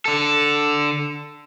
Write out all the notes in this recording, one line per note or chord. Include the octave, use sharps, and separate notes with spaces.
D3 A4